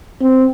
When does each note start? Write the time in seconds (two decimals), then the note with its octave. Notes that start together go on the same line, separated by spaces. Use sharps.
0.21 C4